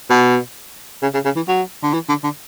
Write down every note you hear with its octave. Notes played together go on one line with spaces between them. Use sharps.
B2
C#3
C#3
C#3
E3
F#3
D3
E3
D3
D3